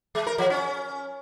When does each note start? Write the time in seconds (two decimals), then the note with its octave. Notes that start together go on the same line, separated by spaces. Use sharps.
0.15 G#3
0.27 A#4
0.38 F3
0.50 C#4